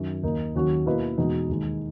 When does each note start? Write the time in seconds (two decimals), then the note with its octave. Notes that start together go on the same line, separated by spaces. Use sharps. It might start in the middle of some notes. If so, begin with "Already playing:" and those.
Already playing: F#2 D#3
0.23 D#2 D#3 A#3 D#4 A#4
0.55 D#2 D#3 F#3 C#4 F#4
0.86 B2 A#3 E4 B4 D#5
1.18 E2 B2 G#3 D#4 F#4
1.49 D#2 D#3 G#3 D#4